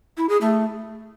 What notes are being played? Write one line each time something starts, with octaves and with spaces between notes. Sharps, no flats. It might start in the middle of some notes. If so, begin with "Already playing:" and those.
E4
G#4
A3